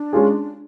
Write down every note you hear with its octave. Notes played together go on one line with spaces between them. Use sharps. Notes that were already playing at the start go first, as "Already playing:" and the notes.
Already playing: D4
G#3 C#4 F4 G#4